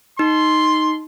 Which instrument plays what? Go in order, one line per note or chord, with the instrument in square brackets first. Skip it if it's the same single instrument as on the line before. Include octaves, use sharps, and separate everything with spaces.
[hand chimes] D#4 [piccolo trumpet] C6